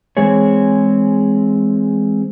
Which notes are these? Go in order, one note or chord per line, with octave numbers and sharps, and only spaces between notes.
E3 G#3 C4 G#4 C#5